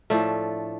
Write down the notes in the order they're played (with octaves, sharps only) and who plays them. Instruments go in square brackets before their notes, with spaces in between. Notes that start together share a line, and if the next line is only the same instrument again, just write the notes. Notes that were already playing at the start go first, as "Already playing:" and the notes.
[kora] A2 F3 A3 D4